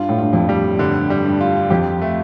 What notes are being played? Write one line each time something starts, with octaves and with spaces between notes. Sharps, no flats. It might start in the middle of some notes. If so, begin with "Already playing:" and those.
Already playing: G2 F4
A2
G2 F4
F2
G3
G2 D3
G3
G2
F4
F2 G4
A3